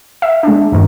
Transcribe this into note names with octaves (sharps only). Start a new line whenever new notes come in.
E5
G#3 D4
E2 G2 D#3